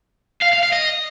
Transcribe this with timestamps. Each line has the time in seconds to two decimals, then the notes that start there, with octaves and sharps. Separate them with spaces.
0.42 F5
0.53 F5
0.63 F5
0.73 D#5